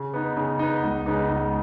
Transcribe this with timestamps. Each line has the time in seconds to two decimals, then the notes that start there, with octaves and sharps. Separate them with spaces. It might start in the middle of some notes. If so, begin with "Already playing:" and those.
Already playing: C#3
0.14 B3 D#4
0.36 C#3
0.59 B3 D#4
0.83 C#2
1.06 C#3 B3 D#4
1.29 C#2